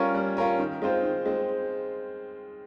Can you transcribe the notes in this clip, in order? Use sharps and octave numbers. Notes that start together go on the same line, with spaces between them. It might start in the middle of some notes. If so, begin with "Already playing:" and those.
Already playing: G3 C#4 F4 A#4 C#5
G3
C#4 F4 A#4 C#5
D#3
G#3 C4 F4 C5
D#3
G#3 C4